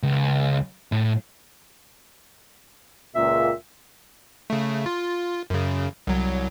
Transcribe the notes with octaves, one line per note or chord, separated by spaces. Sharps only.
C#2
A2
C#2 A#2 E5
C#3 A3
F4
F#2 C#3
C2 F#3